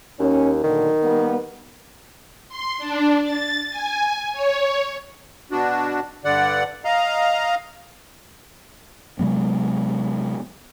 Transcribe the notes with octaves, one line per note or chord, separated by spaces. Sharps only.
D#2 C#4
B1 A#2 D3 D#3
G3 A#3 B3
C6
D4
A6
G#5
C#5
B2 D4 F#4
G2 D3 D5 F#5
D#5 F5 A#5
C3 F#3 G#3 B3